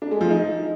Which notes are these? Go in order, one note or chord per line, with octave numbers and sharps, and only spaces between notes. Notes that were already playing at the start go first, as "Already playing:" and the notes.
D4
G#3
F3
D#4